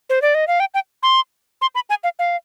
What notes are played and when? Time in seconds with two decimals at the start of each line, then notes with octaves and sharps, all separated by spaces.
0.10 C5
0.22 D5
0.35 D#5
0.48 F5
0.60 G5
0.74 G5
1.03 C6
1.62 C6
1.75 B5
1.90 G#5
2.04 F5
2.19 F5